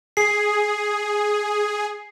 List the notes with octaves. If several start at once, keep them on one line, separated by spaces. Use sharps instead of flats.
G#4 C7